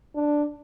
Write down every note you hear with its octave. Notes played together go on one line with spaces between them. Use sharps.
D4